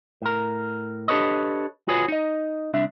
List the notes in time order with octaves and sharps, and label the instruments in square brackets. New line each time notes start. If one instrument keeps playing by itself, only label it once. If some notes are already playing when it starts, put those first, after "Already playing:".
[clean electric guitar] A2 A#4
D4 G4 A4 B4 C#5 D#5
F4 F#4 G#4 B4 C#5
D#4 D#5
C2 D4 E5